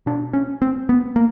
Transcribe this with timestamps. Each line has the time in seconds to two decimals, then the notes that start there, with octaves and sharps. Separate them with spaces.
0.06 B2 D4
0.33 C#4
0.62 C4
0.89 B3
1.16 A#3